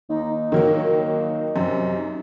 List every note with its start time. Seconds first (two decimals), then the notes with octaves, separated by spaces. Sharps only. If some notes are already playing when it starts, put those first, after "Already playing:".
0.09 D#2 D#4
0.52 D#3 F#3 A#3
1.56 F#2 C3